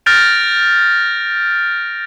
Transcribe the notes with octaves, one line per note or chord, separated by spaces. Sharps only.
F6 G6 A6 A#6 D7 F7